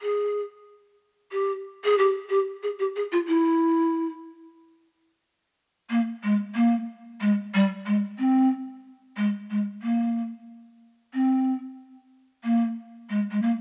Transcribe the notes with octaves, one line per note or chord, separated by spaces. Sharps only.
G#4
G4
G#4
G4
G4
G#4
G4
G#4
F4
E4
A#3
G#3
A#3
G#3
G3
G#3
C4
G#3
G#3
A#3
C4
A#3
G#3
G#3
A#3